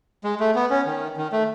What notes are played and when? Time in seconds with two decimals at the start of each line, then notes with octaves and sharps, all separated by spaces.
0.24 G#3
0.40 A3
0.55 B3
0.70 C#4
0.86 D#3
1.17 D#3
1.32 A3